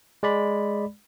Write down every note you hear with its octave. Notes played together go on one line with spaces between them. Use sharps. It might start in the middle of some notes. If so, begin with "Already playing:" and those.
G#3 D5 B5